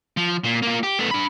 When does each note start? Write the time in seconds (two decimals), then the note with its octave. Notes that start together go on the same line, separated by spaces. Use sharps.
0.17 F3
0.44 A#2
0.63 A#3 F4
0.83 G4
0.99 A3 B3
1.11 D4 B5